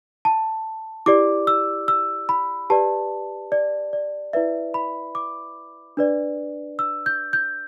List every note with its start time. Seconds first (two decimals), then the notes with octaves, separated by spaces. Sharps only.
0.25 A5
1.06 E4 G4 D5 D6
1.47 E6
1.88 E6
2.29 B5
2.70 G4 B4 D5 A5
3.52 D5
3.93 D5
4.33 E4 B4 D5 E5
4.74 B5
5.15 D6
5.97 D4 B4 D5
6.79 E6
7.06 G6
7.33 G6